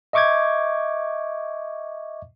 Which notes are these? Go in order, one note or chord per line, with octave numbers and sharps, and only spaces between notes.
D#5 E5 C#6 D6 G6 G#6